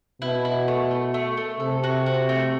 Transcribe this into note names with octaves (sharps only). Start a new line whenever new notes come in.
B2 E4
E4
A3
A3
A3
A3
C3 A4
F#4
F#4
A3